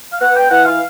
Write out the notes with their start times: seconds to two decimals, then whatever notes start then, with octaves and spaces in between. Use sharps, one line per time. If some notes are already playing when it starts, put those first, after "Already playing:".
0.13 F5
0.21 B3 F#5
0.35 G5
0.50 E3 F#5
0.65 F5